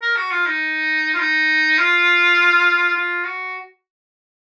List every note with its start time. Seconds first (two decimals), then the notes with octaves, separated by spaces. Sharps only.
0.02 A#4
0.16 F#4
0.31 F4
0.46 D#4
1.14 F4
1.19 D#4
1.78 F4
2.96 F4
3.25 F#4